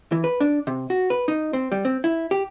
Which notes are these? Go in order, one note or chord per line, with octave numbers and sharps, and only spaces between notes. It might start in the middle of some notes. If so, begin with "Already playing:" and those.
E3
B4
D4
C3
F#4
B4
D#4
C4
G3
C4
E4
G4